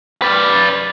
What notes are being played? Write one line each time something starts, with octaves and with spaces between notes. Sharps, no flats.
B4 D5